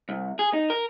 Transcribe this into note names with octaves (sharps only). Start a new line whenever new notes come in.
C2
G#4
D#4
A#4